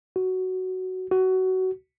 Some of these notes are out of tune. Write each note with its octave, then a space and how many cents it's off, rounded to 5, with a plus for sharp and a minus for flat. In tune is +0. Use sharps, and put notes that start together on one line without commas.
F#4 +10
F#4 +20